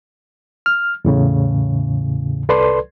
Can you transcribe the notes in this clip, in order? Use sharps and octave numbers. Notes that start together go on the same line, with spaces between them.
F6
E2 A2 C#3
C2 A4 B4 D5 C6